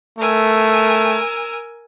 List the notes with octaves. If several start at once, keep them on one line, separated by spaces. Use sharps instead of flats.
A3 A#4 G#5 E6